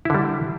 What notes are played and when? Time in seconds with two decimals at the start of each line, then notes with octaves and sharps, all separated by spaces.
0.05 E4
0.10 D3
0.14 G3